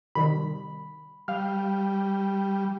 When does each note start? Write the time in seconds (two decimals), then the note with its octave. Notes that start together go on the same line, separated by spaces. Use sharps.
0.15 C3 D#3 G3 B5
1.28 G3 F5 F6